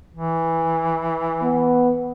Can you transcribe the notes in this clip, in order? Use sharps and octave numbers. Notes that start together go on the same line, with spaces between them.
E3
B3